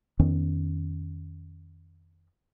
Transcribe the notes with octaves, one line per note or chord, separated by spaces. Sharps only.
F2 D#3 B3 C#4